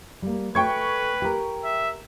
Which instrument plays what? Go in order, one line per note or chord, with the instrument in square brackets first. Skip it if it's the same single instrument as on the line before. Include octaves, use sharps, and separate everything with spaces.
[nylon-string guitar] G3 A#3
[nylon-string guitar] A3 G#4 [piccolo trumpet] B4 [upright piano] G5 C#6 G#6
[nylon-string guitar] G4 A#4
[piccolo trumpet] E5